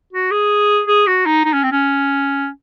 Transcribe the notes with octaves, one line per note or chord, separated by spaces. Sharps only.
F#4
G#4
G#4
F#4
D#4
D#4
C#4
C4
C#4